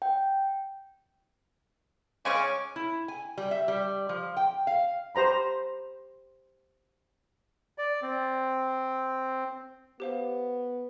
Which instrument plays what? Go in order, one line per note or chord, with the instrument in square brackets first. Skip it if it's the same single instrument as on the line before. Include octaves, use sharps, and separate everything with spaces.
[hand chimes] G5
[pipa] C#3 G#3 C#4 [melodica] G#5 C#6 D6
[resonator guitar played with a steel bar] E4
G#5
G3
E5
G3
F3
G5
F5
[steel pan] G4 C5 A#5 B5
[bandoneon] D5
C4
[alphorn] B3 [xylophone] G4 C5 F5